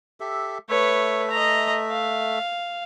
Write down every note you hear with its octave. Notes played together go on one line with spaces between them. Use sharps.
G4 A4 E5
A3 B4 C#5 E5
D#5 A#5
F5